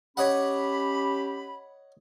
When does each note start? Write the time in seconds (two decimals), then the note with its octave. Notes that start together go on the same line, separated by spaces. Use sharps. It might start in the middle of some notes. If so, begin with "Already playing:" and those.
0.17 C#4 G4 C#5 D#5 F#5 B5